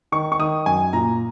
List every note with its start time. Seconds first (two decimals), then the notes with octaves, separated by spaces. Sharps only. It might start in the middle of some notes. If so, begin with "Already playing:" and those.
0.12 D#3 C#6
0.32 C#6
0.39 D#3 D#6
0.66 F#2 G#5
0.93 A#2 A#5